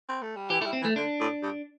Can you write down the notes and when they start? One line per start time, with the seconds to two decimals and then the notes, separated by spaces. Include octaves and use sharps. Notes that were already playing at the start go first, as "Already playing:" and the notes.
0.09 C4
0.22 A3
0.36 G3
0.50 E3 G4
0.60 A3 E4
0.66 G3
0.73 C4
0.82 E3
0.85 A3
0.96 D3 D4
1.20 A2
1.43 G2